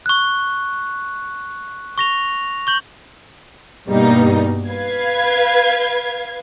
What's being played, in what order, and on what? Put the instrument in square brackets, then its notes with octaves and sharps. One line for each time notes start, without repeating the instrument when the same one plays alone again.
[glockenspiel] C#6 F#6
C#6 A#6 F7
C#6 G6 F#7
[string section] G2 B2 G3 A#3 D#4
B4 F5 G#6